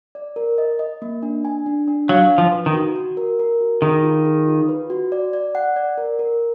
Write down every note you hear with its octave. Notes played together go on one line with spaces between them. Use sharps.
D5
A#4
D#5
D#5
A#3
D4
G#5
D4
D4
F#3 F5
G#5
F3
B4
D#3
F#4
F#4
A#4
A#4
F#4
D#3 G#4
F4
G#4
F4
B4
F#4
D5
D5
F#5
D5
A#4
A#4